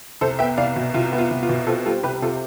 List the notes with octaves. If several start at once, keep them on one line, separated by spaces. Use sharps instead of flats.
C2 A4 C5
B3 E5 G5
C2 D5 F5
B2
C2 F4
B3
F4
C2
F4
B2
C4 F4 A4
G3 F4 A4
C2 G4 B4
C3 F4 A4